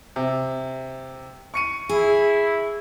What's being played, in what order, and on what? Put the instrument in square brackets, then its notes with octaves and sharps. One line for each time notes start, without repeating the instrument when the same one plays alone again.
[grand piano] C3
C#6 C#7 D#7
[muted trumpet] E4 [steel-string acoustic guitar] G#4